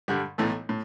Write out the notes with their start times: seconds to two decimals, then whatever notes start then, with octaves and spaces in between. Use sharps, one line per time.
0.08 G2 D3 G3
0.38 B1 A2 E3 A3
0.69 A2